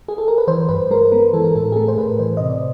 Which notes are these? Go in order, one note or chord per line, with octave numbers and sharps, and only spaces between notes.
G#4
A4
A#4
B4
E3 C5
G2 B4
G#3 A#4
B3 A#4
E3 A4
A#4
A2 A4
G#4
A3 A4
C5
A2 B4
E3 C5
C3 D#5
D5